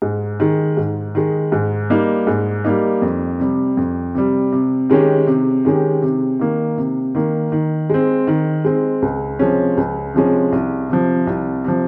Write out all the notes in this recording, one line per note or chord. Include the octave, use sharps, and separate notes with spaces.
G#2
D#3 G#3
G#2
D#3 G#3
G#2
G3 A#3 D#4
G#2
G3 A#3 D#4
F2
C3 G3
F2
C3 G3
C3
D#3 G#3 C#4 G4
C3
D#3 G#3 C#4 G4
C3
D#3 A#3
C3
D#3 A#3
D#3
G#3 C4
D#3
G#3 C4
C#2
C3 F3 G#3 C#4
C#2
C3 F3 G#3 C#4
C2
C3 F3
C2
C3 F3